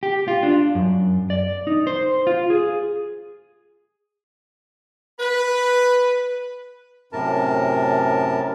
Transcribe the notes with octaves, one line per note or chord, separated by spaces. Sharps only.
G4
F4
D4
F#2
D5
D#4
C5
F4
G#4
B4
F#2 A2 C3 A#4 A5